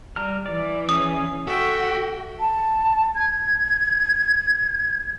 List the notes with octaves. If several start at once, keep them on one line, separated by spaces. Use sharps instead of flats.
G3 A#5 F6
E3 D5
C#4 G#4 D#6
F#4 A4 E5 G5
A5
G#6